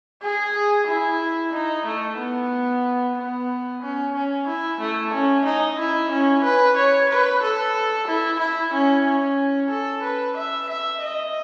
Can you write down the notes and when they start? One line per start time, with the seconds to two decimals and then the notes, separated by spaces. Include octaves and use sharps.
0.22 G#4
0.87 E4
1.53 D#4
1.86 A3
2.18 B3
3.16 B3
3.82 C#4
4.15 C#4
4.47 E4
4.80 A3
5.13 C#4
5.45 D#4
5.79 E4
6.11 C#4
6.44 B4
6.77 C#5
7.09 B4
7.42 A4
8.07 E4
8.39 E4
8.73 C#4
9.05 C#4
9.70 A4
10.03 B4
10.36 E5
10.69 E5
11.02 D#5